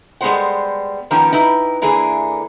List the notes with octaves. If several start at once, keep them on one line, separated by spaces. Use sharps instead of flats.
G3 G#3 B3 B4 C5 F#5
D#3 F3 A#3 B3 C#4 G4
D#4 E4 G4 B4
D3 E3 A#3 E4 G#4 G#5